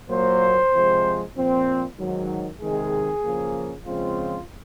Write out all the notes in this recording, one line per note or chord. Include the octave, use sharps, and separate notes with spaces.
A#2 F#3 A#3 C5
C3 F3 G#3
A#2 F3 C4
G#2 D#3 F#3
C3 D#3 G#3 G#4
C#3 F3 A#3
C#3 F3 G#3 C4 F4